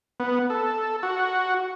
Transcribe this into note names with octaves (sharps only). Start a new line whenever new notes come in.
B3
A4
F#4